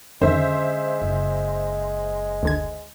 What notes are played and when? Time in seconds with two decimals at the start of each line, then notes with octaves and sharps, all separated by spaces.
0.22 F2 D3 D#3 G#3 C#4 C5 E5
1.02 F#1
2.43 D2 D3 G#6